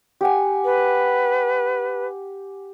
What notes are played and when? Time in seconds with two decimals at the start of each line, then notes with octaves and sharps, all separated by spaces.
0.21 G4 F#5 G#5
0.65 B4